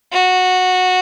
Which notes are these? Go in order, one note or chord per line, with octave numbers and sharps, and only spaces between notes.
F#4